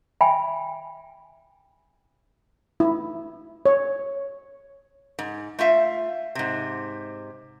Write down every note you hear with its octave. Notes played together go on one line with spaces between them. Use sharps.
E5 G5 G#5 B5
E4
C#5
G#2
A3 F4 E5 F5
G#2 C3